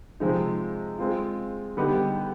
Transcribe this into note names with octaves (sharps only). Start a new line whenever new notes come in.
C3 F3 G#3 C4 D#4
G#3 C4 F4
D3 G3 B3 D#4 G4